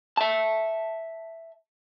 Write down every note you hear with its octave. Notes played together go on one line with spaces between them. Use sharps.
E5 A5